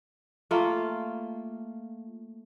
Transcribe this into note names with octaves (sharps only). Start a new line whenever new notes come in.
A3 A#3 F4